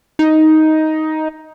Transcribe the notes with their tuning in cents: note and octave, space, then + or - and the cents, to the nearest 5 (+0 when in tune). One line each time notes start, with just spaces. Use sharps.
D#4 +10